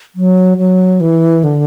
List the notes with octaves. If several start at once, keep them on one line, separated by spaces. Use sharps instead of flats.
F#3
F#3
E3
D3